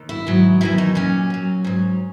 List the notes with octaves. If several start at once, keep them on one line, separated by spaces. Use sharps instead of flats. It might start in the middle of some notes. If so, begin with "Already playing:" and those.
Already playing: D#2
E4
G#2 D#3 F#3
E2 D#3 F#3 E4
D#4
A#2 F#3 C#4
A#2 F#3
G#2 F#3